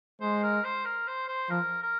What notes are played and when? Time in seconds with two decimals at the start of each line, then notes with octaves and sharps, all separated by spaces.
0.21 G#3 C5
0.43 A#4
0.64 C5
0.85 A#4
1.07 C5
1.28 C5
1.50 F3 A#4
1.82 A#4